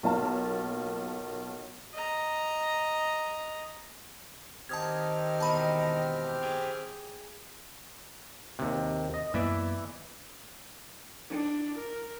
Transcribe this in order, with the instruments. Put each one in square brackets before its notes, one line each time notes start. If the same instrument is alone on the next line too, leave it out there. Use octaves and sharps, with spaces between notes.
[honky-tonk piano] B1 A#3 F4 A5
[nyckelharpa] D#5 A#5
[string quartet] D#3 [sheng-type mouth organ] C4 G4 F6 [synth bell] A5 D#6 G#6
[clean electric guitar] E2 B2 [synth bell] A5 B5
[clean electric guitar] G#4 G5
[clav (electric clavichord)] D#2 C3
D#5
[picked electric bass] F#2 A#3 B3 [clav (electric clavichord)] E3 D5 E5
[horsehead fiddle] D4
A#4